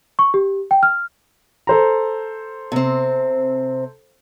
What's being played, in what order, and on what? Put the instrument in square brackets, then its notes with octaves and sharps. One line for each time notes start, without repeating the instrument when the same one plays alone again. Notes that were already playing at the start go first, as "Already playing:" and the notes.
[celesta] C#6
G4
G5
F6
[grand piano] A4 C5 A#5
[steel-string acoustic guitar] C3 C4